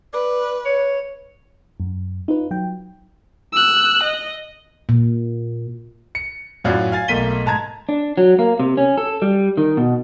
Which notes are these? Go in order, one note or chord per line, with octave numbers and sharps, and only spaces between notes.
B4 D5
C#5
F#2
D#4 F4 B4
F#3 G5
E6 F#6
D#5
A#2
C#7
F#2 A2 F4 F#4 D5 G#6
F5 G#5 A6
B1 A3 A#3 B6 D#7 G7
G#2 A5 A#5 G#6
D4
F#3
A#3
C3
C#4
A4
G3
D#3
B2